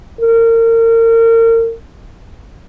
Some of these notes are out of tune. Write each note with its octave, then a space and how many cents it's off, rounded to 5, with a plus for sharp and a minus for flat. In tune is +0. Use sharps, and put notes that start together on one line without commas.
A#4 -30